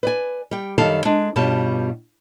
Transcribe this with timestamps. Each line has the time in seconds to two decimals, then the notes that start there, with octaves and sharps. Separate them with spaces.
0.03 B4 D5 G#5
0.51 G3 G5
0.78 F#2 D#3 G3 A4 F5 A5
1.05 G#3 D4
1.36 G2 B2 G3 C#4 F4 A5